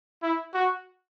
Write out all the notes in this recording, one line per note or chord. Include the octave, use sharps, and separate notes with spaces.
E4
F#4